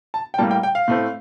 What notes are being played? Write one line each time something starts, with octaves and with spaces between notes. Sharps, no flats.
A5
G5
A2 G3 A#3 A5
G5
G5
F5
A2 A3 C4